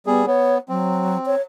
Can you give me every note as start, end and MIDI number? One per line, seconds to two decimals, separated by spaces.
0.06 0.26 55
0.06 0.26 59
0.06 0.26 68
0.26 0.58 59
0.26 0.55 73
0.69 1.17 54
0.69 1.35 60
1.26 1.41 73